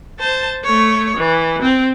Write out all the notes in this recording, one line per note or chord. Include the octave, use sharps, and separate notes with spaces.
C5 A5
A3 C#5
E3
C4